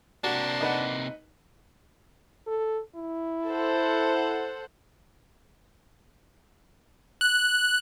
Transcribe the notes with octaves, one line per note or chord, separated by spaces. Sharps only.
C3 A#3 D4 F#4
D#4 B4 F#5
A4
E4
A4 C5 F#5
F#6